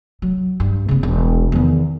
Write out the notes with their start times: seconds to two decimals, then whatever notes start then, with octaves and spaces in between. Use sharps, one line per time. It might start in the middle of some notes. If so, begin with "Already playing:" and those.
0.22 F#3
0.60 G2
0.88 C#3 B3
1.03 E1
1.52 E2 D#3